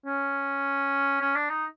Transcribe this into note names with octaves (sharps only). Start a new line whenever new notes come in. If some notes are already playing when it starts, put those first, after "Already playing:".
C#4
C#4
D4
D#4